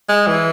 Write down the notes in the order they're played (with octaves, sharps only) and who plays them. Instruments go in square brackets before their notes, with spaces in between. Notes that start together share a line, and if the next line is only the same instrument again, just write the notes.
[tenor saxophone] G#3
E3